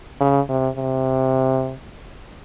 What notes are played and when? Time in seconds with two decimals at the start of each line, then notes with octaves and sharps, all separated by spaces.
0.21 C#3
0.49 C3
0.77 C3